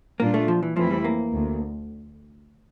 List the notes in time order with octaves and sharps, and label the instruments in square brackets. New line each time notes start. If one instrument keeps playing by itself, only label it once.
[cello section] A#2 G3 D4 F4 [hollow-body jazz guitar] A#3
[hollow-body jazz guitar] A3
F3
E3
[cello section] F2 E3 A3 C4 E4 [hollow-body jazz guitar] F3
[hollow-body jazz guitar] G3
A#3
[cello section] D2